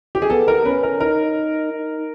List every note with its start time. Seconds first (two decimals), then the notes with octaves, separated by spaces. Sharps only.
0.15 G4
0.22 G#4
0.30 B3 A4
0.48 A#4
0.65 C#4 B4
0.83 A#4
1.00 D#4 A#4
1.72 D#4